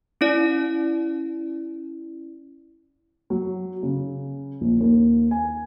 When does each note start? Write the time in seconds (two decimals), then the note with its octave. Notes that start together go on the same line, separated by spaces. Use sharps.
0.21 C#4 E4 D5
3.30 F#3
3.83 C#3
4.61 A#1
4.80 D#2
5.31 G#5